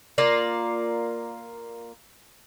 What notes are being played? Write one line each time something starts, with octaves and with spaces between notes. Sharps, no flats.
A#3 F4 D5